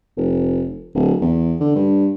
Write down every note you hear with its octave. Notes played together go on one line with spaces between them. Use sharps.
F1
D1
E2
D3
G2